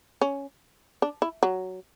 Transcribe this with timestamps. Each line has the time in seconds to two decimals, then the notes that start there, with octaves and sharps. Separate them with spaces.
0.21 C#4
1.02 D4
1.22 E4
1.43 F#3